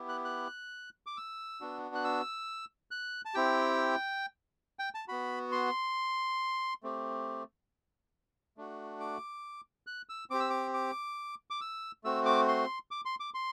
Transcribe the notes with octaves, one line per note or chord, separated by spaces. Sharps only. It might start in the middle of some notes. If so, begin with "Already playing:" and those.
Already playing: B3 E4 G4
F#6
F#6
D6
E6
B3 D4 F#4
F#6
E6
F#6
A5
C4 E4 G4 G5
G5
A5
B3 F#4 B5
C6
A3 C4 G4
A3 D4 F#4
D6
F#6
E6
C4 G4 D6
E6
D6
D6
D6
E6
A3 C4 F#4 E6
D6
C6
D6
C6
D6
C6